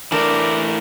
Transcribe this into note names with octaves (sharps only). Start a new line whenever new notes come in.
E3 A3 D4 A#4 D5